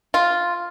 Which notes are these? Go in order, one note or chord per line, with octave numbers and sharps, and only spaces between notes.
F4